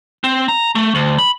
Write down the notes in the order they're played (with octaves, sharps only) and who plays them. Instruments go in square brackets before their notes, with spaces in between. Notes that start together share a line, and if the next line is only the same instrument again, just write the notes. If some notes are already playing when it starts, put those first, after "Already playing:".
[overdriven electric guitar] C4
A#5
A3
D2
B5